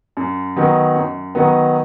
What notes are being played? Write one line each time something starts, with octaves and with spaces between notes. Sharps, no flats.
F#2
D#3 F#3 B3 D#4
F#2
D#3 F#3 B3 D#4